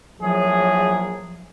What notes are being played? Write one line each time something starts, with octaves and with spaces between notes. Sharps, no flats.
A#1 A2 F3 F#3 G#4